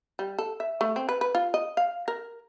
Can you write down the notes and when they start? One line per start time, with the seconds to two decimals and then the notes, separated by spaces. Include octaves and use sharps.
0.19 G3
0.39 A4
0.60 E5
0.81 A3
0.96 C4
1.09 B4
1.21 B4
1.35 F4
1.54 D#5
1.77 F5
2.08 A#4